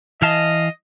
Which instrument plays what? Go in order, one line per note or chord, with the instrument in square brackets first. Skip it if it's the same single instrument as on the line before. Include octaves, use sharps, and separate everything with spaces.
[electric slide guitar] E3 F5 A5 [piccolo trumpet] D#5